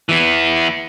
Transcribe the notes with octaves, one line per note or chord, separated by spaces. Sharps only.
E3 B3